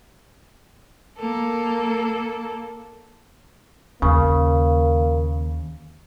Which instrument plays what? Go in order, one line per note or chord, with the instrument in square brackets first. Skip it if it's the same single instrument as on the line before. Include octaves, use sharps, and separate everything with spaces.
[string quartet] A#3 A4
[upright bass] D#2 [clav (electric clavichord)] C#3 [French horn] A#3